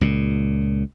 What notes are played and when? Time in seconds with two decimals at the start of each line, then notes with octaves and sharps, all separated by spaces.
0.01 C#2 A#2